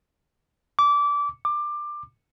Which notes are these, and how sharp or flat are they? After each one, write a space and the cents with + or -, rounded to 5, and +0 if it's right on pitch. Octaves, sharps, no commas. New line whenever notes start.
D6 -20
D6 +20